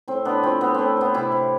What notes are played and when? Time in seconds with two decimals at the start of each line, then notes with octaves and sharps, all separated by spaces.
0.08 A2 C4
0.25 A2 B3 D4
0.43 F3 C4
0.61 A3 B3
0.74 A2 C4
0.97 A2 B3
1.14 C3 E4 G4
1.32 C3